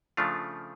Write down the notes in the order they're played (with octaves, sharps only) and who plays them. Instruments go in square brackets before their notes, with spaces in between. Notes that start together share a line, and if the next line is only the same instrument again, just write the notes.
[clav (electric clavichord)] C#3 F3 A3 D4 F4